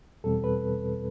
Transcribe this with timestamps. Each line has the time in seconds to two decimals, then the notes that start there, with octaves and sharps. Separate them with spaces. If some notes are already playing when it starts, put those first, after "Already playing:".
0.24 E2 B2 G3 C4 A4
0.44 B4